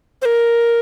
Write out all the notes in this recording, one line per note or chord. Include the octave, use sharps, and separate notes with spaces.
C5
A#4